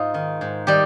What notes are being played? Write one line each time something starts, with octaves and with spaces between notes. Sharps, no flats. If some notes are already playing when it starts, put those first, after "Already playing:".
Already playing: G#2 D#4 F4
D#3
G#2
D#3 G3 G4